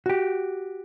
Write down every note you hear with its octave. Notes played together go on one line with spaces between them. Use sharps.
F#4 G4